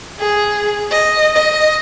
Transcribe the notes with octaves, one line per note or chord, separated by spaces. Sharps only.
G#4
D#5
D#5